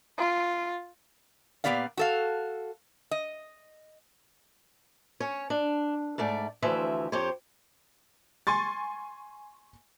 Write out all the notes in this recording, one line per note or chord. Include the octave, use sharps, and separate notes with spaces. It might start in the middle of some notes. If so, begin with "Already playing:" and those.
F4
A#2 E3 B3 G4 D5 F5
F#4 A4 F5
D#5
C#4 C#5
D4
G#2 A3 D5
D2 E3 F3 E5
F2 G4 C5 C#5
G#5 C6 C#6 A6